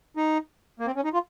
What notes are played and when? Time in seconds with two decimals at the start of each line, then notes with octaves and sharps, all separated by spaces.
0.17 D#4
0.80 A#3
0.87 C4
0.96 C#4
1.04 D#4
1.14 F4